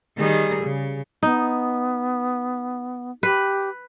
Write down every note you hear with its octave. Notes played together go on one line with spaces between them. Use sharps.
D#3 G3 G#4
C#3
B3 D#4
G4 B4